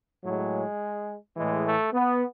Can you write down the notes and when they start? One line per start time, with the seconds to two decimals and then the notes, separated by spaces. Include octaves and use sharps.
0.24 A2 F#3 G#3
1.36 A2 E3 G#3
1.65 A3
1.93 B3